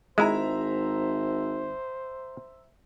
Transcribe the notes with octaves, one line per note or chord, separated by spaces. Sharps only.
G#1 G#3 E4 C5 E5 A#5